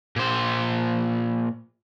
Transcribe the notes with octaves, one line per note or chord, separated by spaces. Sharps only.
A#2 C5